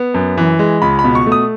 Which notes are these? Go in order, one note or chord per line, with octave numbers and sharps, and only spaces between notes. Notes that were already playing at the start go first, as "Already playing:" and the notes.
Already playing: B3
F#2
E3
G#3
C#2 B5
B5
B2
C#6
A3
D#6